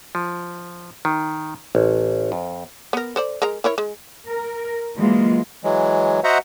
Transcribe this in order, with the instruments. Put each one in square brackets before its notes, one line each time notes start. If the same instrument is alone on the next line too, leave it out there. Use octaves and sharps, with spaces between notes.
[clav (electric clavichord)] F3
D#3
A1
F2
[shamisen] B3 A#4
A4 C5 D5
G#3 A#4 A#5
E4 A#4 C#5
G#3
[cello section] A#4
E3 F#3 G#3 A#3 F4
[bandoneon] E3 F#3 G#3
F#4 C5 D#5 E5 F#5 A#5